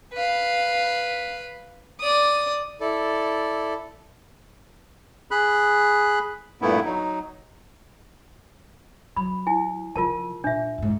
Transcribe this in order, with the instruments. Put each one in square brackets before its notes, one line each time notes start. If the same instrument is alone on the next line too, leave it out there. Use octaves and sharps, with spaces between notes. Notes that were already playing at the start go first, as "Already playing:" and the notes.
[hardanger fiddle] B4 F5
D5 D#6
[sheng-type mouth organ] E4 A4 D5
[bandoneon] G#4 B5 F#6
G2 A#2 A3 B3 E4
F#3 D#4
[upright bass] F#3 [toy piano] B5
[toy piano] E4 G#5
[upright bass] C#3 F3 [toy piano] F4 A#4 A5
[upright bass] A#2 [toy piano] D4 E5
[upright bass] F2 G#2